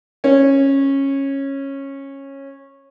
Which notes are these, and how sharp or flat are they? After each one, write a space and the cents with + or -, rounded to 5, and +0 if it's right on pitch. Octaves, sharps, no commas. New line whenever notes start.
C#4 -15